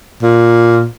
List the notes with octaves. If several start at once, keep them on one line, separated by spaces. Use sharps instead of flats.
A#2